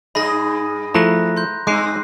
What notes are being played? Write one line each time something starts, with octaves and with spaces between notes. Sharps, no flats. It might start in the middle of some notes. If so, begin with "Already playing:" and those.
G2 G#4 D#5 B5 A#6
F3 A3 E4 A#5 F#6 A#6
C6 G6
G2 G#3 C4 D6 F#6 C7